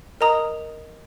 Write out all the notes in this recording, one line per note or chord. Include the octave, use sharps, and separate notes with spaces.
A#4 D#5 A#5 D#6